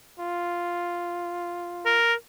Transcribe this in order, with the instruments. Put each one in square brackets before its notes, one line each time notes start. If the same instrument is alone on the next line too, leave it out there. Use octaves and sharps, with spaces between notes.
[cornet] F4
[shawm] A#4